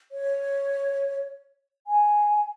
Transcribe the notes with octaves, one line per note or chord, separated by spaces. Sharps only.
C#5
G#5